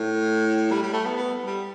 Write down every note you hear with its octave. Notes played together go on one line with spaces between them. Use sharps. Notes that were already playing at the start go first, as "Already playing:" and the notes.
Already playing: A2
G3
G3
A3
B3
B3
G3